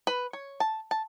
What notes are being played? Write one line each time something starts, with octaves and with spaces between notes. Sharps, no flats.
B4
C#5
A5
A5